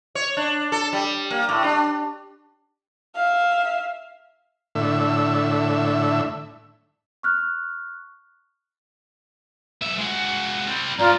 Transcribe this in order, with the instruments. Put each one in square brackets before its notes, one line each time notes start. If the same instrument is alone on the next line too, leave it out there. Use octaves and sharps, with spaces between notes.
[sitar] C#5
D4
A4
G3
A#3
A2
D4
[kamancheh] E5 F5
[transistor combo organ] A2 D3 E5
[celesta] C#6 F6 F#6
[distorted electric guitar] B1 E5
G#3 F#4
G3 C4
[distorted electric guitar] G2 F3 [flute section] F4 D5 A#5